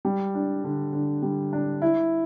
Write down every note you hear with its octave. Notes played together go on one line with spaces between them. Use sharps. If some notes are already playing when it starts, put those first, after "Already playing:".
G3
D4
D3
D3
G3
D4
E4